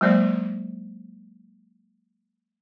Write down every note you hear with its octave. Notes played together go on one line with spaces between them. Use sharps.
F#3 G#3 A#3 C5 D5